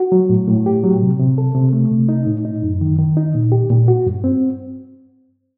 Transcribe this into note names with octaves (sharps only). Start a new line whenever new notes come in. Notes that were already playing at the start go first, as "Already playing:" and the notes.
Already playing: F#4
F#3
A2
A2
G4
F#3
C3
C3
A4
C3
A3
C3
D#4
A2
D#4
F#2
D#3
D#3
D#4
A#2
G4
A#2
F#4
G2
C4